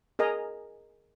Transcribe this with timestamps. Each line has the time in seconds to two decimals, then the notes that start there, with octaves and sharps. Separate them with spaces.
0.19 G#4 A#4 D#5 G#5 A#5